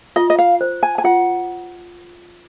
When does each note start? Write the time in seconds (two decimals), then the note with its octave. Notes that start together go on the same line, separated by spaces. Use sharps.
0.16 F4 D#5
0.30 D#5
0.38 F5
0.61 C5
0.83 G#5
0.98 G#5
1.04 F4 F#5